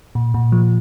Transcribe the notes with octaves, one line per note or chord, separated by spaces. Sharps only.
A#2
A#2
F3